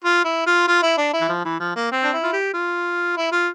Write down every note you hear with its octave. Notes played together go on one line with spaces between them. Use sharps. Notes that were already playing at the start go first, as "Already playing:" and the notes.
F4
E4
F4
F4
E4
D4
E4
E3
F3
E3
F3
A#3
C4
D4
E4
F4
G4
F4
E4
F4